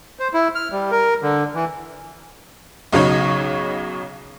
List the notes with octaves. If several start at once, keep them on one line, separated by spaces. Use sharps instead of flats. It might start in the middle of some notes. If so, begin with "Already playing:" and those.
C5
E4
F6
G3
A#4
D3
E3
B1 C#3 F#3 D#4 C#5